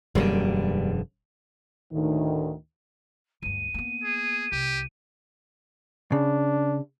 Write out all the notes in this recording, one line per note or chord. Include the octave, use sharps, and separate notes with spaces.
E1 F#2 D3 G3 A#3
D2 A2 D3 D#3
D2 G2 D#7
A#3 B3
G#4
C2 G4
C#3 D4